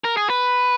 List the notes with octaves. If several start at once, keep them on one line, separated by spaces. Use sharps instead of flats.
A#4
G#4
B4